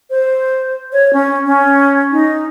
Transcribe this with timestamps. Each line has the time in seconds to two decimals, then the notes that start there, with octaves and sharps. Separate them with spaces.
0.10 C5
0.93 C#5
1.13 C#4
1.46 C#4
2.12 D#4